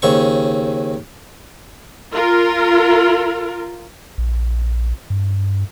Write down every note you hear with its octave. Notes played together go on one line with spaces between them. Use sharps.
D#2 C#3 C4 C#6
F4 A#4
A#1
G2